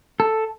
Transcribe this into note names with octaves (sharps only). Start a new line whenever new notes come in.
A4